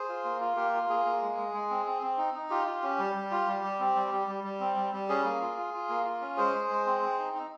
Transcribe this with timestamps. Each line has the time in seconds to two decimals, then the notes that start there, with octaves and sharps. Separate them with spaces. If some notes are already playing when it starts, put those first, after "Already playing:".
Already playing: G#4 C5
0.09 F4
0.24 A#3
0.41 F4
0.56 A#3 G4 A#4
0.73 F4
0.89 A#3 G#4
1.05 A#3
1.22 G#3
1.37 G#3
1.53 G#3
1.70 C4
1.86 C4
2.02 C4
2.18 D#4
2.34 D#4
2.50 F4 G4
2.67 F4
2.83 C#4
2.99 G3
3.15 G3
3.31 F4
3.47 G3
3.64 G3
3.80 C4
3.95 G3
4.11 G3
4.27 G3
4.44 G3
4.60 C4
4.76 G3
4.93 G3
5.09 C#4 G#4
5.25 A#3
5.41 F4
5.57 F4
5.74 F4
5.89 A#3
6.06 F4
6.21 C#4
6.37 G#3 G#4 C5
6.54 G#3
6.70 G#3
6.86 C4
7.02 C4
7.19 D#4
7.34 D#4